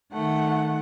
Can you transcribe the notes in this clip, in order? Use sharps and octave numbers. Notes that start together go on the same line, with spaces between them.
D#3 A3 F#5